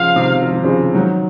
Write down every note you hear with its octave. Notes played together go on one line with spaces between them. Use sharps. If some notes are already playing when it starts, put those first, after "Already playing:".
Already playing: C#3 F3 F5
C3 D#3
F3
D#3
C#3 F3
D#3 F#3